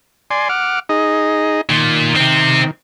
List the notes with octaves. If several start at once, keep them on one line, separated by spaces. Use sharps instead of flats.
D5 G#5 C6
F#5 D6 F6
D#4 G#4 D#5
A#2 D#3
C3 C4